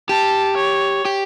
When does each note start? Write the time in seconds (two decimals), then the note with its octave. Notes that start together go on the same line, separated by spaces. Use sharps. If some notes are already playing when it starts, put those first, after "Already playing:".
0.09 G4 A5
0.57 C#5
1.05 G4